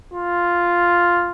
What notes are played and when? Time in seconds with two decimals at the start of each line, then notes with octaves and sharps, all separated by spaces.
0.14 F4